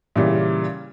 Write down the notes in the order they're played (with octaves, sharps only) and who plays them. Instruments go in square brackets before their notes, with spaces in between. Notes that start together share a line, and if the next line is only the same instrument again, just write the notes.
[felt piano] A#2 C#3 E3 G3